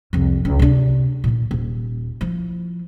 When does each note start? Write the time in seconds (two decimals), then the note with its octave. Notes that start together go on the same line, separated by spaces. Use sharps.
0.13 C2 F2
0.45 C#2
0.59 C3 D4
1.24 A#2 D#3
1.51 D#1
2.21 F3 E4